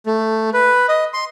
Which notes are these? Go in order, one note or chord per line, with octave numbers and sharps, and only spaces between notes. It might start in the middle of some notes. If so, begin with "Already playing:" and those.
A3
B4
D#5
C6